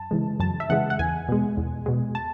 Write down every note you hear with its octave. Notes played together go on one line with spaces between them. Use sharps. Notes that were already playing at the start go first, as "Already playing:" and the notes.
Already playing: F#2 A5
C#3 E3 G#3
F#2 A5
E5
C#3 E3 G#3 F#5
F#5
E2 G#5
B2 G#3
E2
B2 G#3
A5